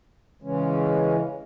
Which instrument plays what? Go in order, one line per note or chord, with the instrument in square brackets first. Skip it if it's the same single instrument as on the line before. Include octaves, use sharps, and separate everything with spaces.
[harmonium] C#3 E3 G#3 C#4